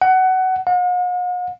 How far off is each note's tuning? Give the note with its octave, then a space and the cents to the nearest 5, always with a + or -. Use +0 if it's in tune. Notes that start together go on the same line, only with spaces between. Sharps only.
F#5 +20
F#5 -45